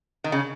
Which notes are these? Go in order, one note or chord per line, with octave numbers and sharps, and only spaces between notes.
D#3
C#3